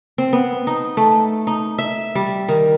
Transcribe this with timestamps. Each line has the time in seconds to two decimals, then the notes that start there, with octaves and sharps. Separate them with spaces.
0.18 C4
0.33 B3
0.67 D#4
0.97 A3
1.47 D#4
1.78 E5
2.15 G3
2.49 D#3